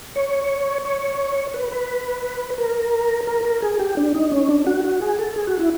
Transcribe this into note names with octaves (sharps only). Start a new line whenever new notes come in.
C#5
C#5
B4
B4
A#4
A#4
A#4
G#4
G4
D4
D#4
C#4
D4
F#4
F#4
G#4
A4
G#4
F#4
E4